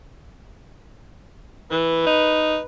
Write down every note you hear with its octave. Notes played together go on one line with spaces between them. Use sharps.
E3 B4
D#4